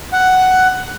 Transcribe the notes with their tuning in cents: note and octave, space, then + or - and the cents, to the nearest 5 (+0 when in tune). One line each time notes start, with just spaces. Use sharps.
F#5 +10